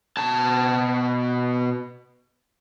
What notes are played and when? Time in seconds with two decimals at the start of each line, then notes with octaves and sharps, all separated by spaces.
0.17 B2 A5